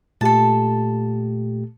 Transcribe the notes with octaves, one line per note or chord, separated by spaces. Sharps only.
A#2 A3 G4 A4 A5